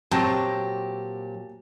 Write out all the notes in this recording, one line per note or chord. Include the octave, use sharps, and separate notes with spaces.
A#2 F#3 C4 G4 C#5 A5 A#6